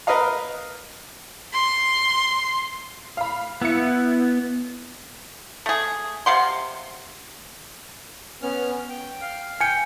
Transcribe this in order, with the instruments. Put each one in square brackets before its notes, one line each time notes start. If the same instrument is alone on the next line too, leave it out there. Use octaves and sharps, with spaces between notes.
[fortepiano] A#4 B4 D#5 F5
[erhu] C6
[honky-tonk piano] F5 B5
[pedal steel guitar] B3 [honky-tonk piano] E4 C#7
[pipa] A3 G#4
C3 F5 F#5 C6
[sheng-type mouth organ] B3 C#4 F6
G5
[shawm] F5
[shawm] G5 [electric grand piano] G#5 C#7